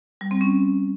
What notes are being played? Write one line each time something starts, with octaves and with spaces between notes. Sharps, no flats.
G3
C4
C#4